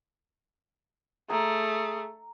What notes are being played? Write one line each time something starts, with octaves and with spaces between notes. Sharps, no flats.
A3 G#4 A#5